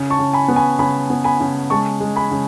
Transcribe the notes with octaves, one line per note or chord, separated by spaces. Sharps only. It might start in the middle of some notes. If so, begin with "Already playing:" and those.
Already playing: C#3
A5 C#6
C#3
G#5 B5
B3
G#5 B5
C#3 G#5 B5
B3
G#5 B5
C#3
G#3 A5 C#6
G#3
G#5 B5
C#3